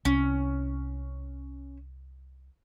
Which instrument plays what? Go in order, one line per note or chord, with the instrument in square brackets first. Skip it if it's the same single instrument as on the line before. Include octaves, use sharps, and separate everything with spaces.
[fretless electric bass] C2 [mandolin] C#4